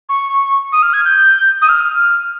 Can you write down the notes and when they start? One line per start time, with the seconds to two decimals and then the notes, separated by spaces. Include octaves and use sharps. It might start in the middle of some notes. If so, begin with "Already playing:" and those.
0.09 C#6
0.72 D#6
0.83 F6
0.93 G#6
1.05 G6
1.62 D#6
1.69 F6